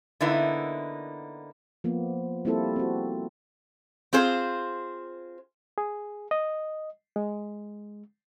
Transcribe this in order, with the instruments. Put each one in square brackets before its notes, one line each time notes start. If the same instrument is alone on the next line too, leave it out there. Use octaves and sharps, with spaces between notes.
[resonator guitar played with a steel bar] D3 A#3 B3 D#4 E4
[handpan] F3 A#3 B3
G3 A#3 C4 E4 F4 A4
C4 F#4
[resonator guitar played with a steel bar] C4 F4 G#4 C5
[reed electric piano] G#4
D#5
G#3